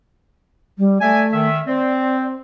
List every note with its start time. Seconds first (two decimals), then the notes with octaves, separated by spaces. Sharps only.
0.78 G3
1.01 A3 D5 E5 G#5
1.33 D#3 E5
1.67 C4 D5